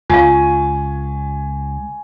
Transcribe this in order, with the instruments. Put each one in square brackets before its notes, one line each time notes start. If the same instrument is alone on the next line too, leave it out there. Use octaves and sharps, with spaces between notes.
[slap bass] C#2 [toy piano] F4 F5 [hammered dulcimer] G#5 C#6